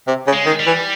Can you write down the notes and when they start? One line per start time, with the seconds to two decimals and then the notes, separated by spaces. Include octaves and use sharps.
0.08 C3
0.27 C#3
0.33 G#3
0.46 D#3
0.60 G3
0.67 E3